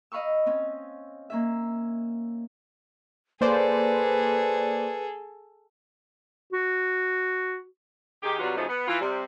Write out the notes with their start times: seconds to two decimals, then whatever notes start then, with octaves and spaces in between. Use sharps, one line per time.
0.12 D#5 F5 B5 C#6 E6
0.46 C4 C#4
1.30 A#3 C#4 E5
3.41 A#3 G#4 A4 B4 C5 D5
6.53 F#4
8.23 D#3 G4 G#4
8.39 C3 F#3 G3 F4 F#4 B4
8.58 C#3 F3 F#3 A3 D#4 G#4
8.69 B3
8.88 E3 F4
9.01 C3 G3